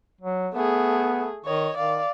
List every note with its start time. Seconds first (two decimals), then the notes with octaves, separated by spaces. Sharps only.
0.21 F#3
0.54 A3 B3 G#4
1.45 D#3 C#5 D#5
1.77 D#3 D5 F5